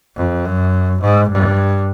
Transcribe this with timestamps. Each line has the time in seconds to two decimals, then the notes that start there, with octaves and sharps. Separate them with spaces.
0.16 F2
0.45 F#2
1.02 G#2
1.30 G2